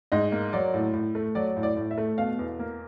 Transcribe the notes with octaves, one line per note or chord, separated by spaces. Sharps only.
G#2 D#5
A#3
F#3 D5
A2
A2
A3
F#3 D5
A2
D5
A2
E5
A3
B2 F5
E2
A#3